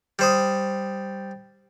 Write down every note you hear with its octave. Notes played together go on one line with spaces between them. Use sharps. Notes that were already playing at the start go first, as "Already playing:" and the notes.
G3 C5 D#6